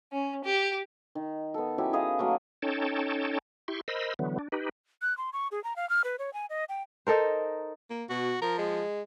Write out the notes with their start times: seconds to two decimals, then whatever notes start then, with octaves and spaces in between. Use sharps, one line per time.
0.12 C#4
0.44 G4
1.15 D#3
1.54 B3 A4
1.78 F#3 C#4 E4 G4
1.93 G#4 B4 D#5 F5
2.19 F#3 A3 A#3
2.62 C#4 D#4 A4 C#5 G5 A5
3.68 E4 G4 C6 C#6
3.88 A#4 C5 D#5 B5 E6
4.19 D3 E3 F#3 B3
4.39 D4
4.52 D#4 G4 B4
5.02 F#6
5.18 C6
5.33 C#6
5.52 G#4
5.64 A#5
5.76 F5
5.90 F6
6.04 B4
6.19 C#5
6.34 G#5
6.50 D#5
6.69 G5
7.07 D#4 A4 A#4 C5
7.90 A#3
8.09 B2 F#4
8.42 F3 A#4
8.58 G#3